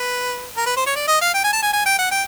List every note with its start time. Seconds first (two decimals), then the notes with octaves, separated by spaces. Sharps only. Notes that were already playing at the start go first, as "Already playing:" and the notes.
Already playing: B4
0.57 A#4
0.66 B4
0.77 C5
0.86 C#5
0.95 D5
1.08 D#5
1.21 F5
1.34 G5
1.44 G#5
1.53 A5
1.62 G#5
1.73 G#5
1.86 G5
1.99 F#5
2.11 G5